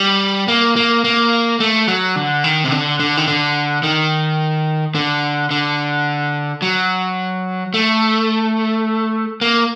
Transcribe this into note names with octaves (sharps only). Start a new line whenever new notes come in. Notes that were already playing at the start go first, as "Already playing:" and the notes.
Already playing: G3
A#3
A#3
A#3
A3
F#3
D3
D#3
C3
D3
D3
D#3
D3
D#3
D3
D3
F#3
A3
A#3